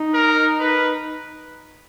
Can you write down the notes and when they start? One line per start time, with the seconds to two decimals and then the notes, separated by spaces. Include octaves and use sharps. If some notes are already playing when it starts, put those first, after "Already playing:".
Already playing: D#4
0.14 A#4
0.60 B4